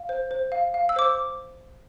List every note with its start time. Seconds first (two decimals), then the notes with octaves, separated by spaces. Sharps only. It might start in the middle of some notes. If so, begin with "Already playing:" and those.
Already playing: F5
0.09 C5
0.31 C5
0.52 F5
0.74 F5
0.89 E6
0.96 C5 D6